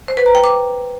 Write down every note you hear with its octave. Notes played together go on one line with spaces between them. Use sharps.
C5
B4
A#5
G5
D6